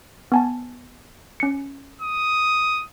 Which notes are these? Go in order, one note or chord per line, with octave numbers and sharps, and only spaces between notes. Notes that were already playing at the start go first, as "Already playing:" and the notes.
B3 G#5 A5
C#4 C#7
D#6